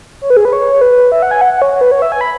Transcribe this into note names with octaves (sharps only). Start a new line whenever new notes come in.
C#5
B4
G#4
B4
C#5
B4
E5
F#5
G#5
F#5
F#5
C#5
C#5
B4
C#5
E5
G#5
B5